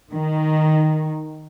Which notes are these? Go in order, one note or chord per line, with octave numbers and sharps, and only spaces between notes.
D#3